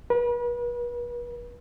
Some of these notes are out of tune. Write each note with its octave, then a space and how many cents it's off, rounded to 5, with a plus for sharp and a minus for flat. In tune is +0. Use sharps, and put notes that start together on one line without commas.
B4 -40